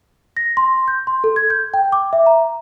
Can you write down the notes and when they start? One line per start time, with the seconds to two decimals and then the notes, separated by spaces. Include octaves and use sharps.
0.37 A#6
0.57 C6
0.88 G6
1.07 C6
1.24 A4
1.36 G#6
1.50 G6
1.74 G5
1.92 D6
2.13 E5
2.26 A#5